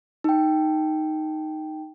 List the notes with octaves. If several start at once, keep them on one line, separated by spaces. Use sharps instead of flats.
D#4 G5